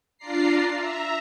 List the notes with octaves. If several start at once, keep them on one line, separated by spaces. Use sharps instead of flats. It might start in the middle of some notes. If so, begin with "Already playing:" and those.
D4 F4 D5 A#5 C7
E5 A#5